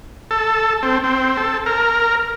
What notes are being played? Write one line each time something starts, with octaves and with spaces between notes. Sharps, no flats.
A4
C4
C4
A4
A#4